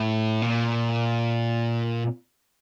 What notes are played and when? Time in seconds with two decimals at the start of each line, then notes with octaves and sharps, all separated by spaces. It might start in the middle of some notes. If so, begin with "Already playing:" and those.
Already playing: A2
0.42 A#2